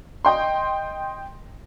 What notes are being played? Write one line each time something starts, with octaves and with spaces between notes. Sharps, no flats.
D#5 G5 C6